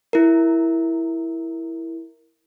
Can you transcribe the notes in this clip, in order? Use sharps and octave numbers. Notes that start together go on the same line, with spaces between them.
E4 A#4